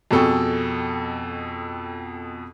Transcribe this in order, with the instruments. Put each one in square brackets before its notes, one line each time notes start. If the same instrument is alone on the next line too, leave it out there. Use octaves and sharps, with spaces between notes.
[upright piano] F2 B2 G#4 A4 G5 C#6